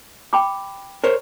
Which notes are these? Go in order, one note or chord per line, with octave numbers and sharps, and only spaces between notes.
G5 B5 D6
A#4 C5 C#5